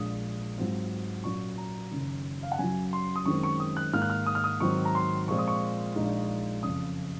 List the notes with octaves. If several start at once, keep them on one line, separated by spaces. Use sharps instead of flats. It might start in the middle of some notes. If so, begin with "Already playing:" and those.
Already playing: A#1 A#2 G#3 D#6
G#2 F#3 C4 F4
A#2 F#3 C#4 C#6
A#5
F#1 F#2 D#3
F5
F#5
F#2 C#3 F#3 G#5
C6
D#6
F#2 D#3 G#3 C4 C#6
C#6
D#6
F#6
G#2 D#3 A#3 F6
F#6
F6
D#6
F6
D#6
G#2 D#3 F#3 C4 D#4 C#6
A#5
C6
A#2 F3 G#3 C4 C#6
D#6
C#6
A#1 A#2 G#3 D#4
F#1 F2 C#3 D#6